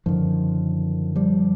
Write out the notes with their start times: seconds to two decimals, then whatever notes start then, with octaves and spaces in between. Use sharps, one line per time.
0.06 F#2 D3 D#3 F3
1.16 F3 G3